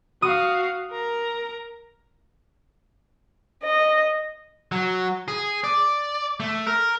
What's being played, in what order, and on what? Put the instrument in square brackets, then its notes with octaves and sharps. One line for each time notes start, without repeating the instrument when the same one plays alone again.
[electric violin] F#4 F5 [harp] D#6
[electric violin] A#4 A#5
[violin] D#5
[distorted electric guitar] F#3
G#4
D5
A3
A#4